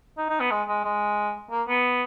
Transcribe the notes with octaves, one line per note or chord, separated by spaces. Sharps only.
D#4
D#4
B3
G#3
G#3
G#3
A#3
B3